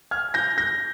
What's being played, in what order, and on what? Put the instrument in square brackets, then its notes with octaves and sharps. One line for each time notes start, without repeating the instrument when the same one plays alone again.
[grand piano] F6 G#6
G6 A#6
G6 A#6